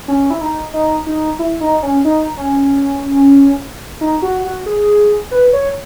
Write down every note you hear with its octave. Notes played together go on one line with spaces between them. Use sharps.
C#4
E4
D#4
D#4
D#4
E4
D#4
C#4
D#4
C#4
D#4
F#4
F#4
G#4
B4
C#5